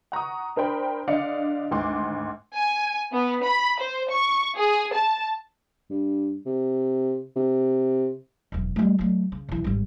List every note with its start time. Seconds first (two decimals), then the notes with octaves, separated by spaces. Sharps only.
0.12 F#5 A#5 C#6 D#6
0.56 D4 A#4 C5 G5 B5
1.07 D3 D5 D#5 F5 C#7
1.71 G#1 D2 C6 D6
2.55 G#5
3.12 B3
3.43 B5
3.80 C5
4.09 C#6
4.57 G#4
4.92 A5
5.90 G2
6.46 C3
7.36 C3
8.52 E1 F#2
8.76 G3 A3
8.99 F#3 A3
9.32 C#3
9.49 B1 E3
9.64 G#1 G3